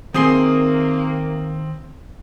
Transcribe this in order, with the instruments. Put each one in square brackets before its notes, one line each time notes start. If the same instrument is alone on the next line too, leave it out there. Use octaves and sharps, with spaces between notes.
[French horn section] C3 A#3 [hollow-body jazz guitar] D#3 G#4 C6 [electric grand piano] C4 D#6 C7